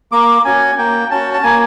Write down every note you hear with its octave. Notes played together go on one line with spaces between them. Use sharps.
A#3 D6
C#4 F#4 G#5
A#3 G5
C#4 F#4 A5
A5
A#3 G#5